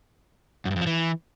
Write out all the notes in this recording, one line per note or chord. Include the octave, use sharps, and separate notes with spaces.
F#2
G2
F2
F3
E3